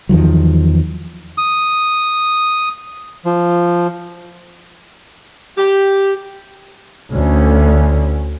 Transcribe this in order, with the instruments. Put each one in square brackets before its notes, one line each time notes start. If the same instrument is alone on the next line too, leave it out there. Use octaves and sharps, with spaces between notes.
[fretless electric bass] E2 D#3 F3 F#3
[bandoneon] D#6
F3
[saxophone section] G4
[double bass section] D2 C#4